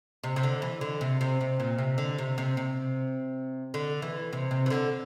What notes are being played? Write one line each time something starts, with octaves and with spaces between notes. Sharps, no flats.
C3
C3
D3
E3
D3
C3
C3
C3
A#2
C3
D3
C3
C3
C3
D3
E3
C3
C3
E3
D3